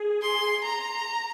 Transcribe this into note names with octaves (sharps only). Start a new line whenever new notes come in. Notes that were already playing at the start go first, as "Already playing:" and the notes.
Already playing: G#4
C6
A#5